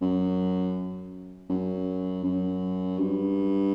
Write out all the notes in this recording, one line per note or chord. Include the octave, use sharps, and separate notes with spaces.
F#2
F#2
F#2
G2